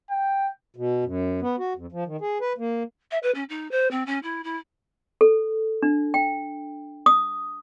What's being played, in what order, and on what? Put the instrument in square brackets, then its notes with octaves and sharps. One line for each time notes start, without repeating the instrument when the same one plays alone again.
[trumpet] G5
[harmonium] B2
F#2
B3
F#4
F2
F3
D#3
G#4
B4
A#3
[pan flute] E5
B4
C#4
D#4
C5
C4
C#4
E4
E4
[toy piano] A4
D4
G5
D#6